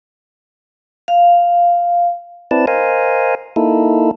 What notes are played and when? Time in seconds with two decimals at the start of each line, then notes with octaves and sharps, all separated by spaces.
1.08 F5
2.51 C4 E4 B4 D5 A5
2.67 A#4 C5 D#5 F5 G#5
3.56 A#3 D#4 E4 A4